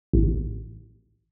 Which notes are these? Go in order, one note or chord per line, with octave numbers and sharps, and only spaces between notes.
A1